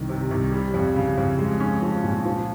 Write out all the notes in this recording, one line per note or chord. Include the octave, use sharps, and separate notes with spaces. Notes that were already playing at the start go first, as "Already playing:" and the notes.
Already playing: C2 D#3
C3
C2
G3
F2
C#3
F2
G#3
C#4
F3
A#2
F3